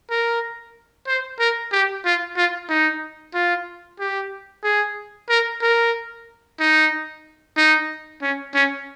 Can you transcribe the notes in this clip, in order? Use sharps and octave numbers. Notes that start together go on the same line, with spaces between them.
A#4
C5
A#4
G4
F4
F4
D#4
F4
G4
G#4
A#4
A#4
D#4
D#4
C#4
C#4